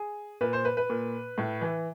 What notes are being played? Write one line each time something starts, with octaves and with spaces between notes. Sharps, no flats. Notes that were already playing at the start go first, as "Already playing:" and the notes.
Already playing: G#4
A#2 B4
C5
B4
B4
A#2
A2
E3